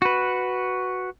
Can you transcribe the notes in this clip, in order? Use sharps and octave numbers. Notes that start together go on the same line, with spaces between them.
F#4 B4